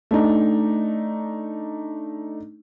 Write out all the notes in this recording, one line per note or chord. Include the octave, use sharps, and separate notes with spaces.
A3 D4 D#4